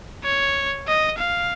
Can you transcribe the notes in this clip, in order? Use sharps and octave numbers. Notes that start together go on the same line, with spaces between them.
C#5
D#5
F5